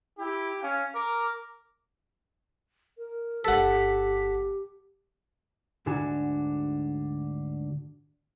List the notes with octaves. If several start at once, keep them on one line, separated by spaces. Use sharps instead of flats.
E4 G4
C#4 F5
A#4 D6
A#4
G1 G4 A4 F#5 B6
D2 G#2 D3 D4 F#4 G#5